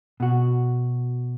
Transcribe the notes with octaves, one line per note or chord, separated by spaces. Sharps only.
B2 F#4